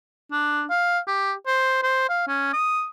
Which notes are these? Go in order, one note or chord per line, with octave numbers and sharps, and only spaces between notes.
D4
F5
G4
C5
C5
F5
C#4
D#6